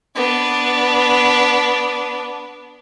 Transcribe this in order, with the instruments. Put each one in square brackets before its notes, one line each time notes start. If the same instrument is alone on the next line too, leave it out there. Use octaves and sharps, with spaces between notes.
[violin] B3 D4